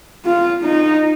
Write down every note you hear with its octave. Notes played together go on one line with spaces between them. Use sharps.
F4
D#4